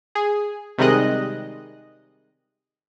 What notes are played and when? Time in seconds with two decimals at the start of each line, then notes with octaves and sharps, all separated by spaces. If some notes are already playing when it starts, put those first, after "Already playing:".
0.15 G#4
0.78 C3 D#3 G3 G#3 D#5 F#6